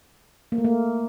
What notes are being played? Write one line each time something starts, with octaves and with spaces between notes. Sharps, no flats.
A#3
A3
A#3